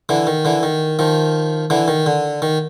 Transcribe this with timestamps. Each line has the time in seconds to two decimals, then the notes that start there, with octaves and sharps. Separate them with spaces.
0.09 D3 E3
0.27 D#3
0.45 D3 E3
0.63 D#3
0.99 D#3 F3
1.70 D3 E3
1.88 D#3
2.06 D3
2.42 D#3